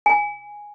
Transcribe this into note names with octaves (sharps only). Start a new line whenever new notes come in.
G#5